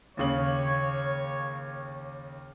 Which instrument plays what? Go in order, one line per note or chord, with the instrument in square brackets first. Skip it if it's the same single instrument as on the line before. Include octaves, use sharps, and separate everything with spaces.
[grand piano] D#2 C#3 F#7 [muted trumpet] C#5